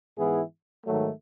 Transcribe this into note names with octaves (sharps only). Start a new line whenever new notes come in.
G#2 E3 B3 E4 G#4
G#2 D#3 F#3 A3